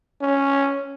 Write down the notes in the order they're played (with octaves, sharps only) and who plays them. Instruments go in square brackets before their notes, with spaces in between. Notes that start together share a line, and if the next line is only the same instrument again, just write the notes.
[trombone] C#4